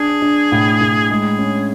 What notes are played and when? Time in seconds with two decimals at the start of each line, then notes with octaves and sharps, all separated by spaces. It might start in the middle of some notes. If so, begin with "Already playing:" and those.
Already playing: D4 G#4
0.22 D4
0.52 A2
0.81 A2
1.10 G#3 G#4
1.38 C#4